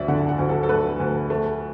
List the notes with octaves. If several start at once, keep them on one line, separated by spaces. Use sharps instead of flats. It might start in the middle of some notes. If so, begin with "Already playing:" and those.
Already playing: D2 D5 E5
D3 F#5
F#5
D2
A4
A4
A3 B4
D2
A3